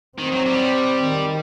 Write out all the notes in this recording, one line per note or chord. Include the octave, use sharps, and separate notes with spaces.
D#3 C4
F#3
G3
D#3